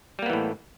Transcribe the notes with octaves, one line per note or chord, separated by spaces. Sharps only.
A2 E3 G3 A#3 B3